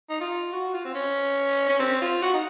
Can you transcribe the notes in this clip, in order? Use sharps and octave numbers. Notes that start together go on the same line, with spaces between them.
D#4
F4
F#4
F4
C4
C#4
C#4
C4
F4
F#4
D#4